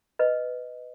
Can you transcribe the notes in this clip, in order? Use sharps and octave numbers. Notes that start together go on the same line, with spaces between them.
B4 D#5